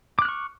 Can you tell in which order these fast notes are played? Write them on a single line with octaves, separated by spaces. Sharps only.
D6 F#6 F6 C#6